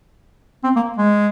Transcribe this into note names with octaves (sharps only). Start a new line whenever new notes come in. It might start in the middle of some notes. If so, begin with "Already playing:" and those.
C4
A#3
G#3